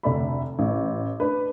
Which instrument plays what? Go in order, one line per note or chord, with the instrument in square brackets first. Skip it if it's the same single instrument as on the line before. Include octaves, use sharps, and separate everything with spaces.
[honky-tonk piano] F1 D2 A3 D5 E5 B5
A1
D4 B4